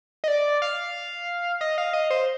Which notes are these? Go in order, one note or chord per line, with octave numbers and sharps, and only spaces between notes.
D#5
D5
F5
D#5
F5
D#5
C5